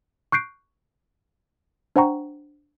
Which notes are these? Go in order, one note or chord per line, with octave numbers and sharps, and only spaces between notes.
C#6 F#6 G6 C7 D7
D4 C5 F#5 G5 A#5 C#6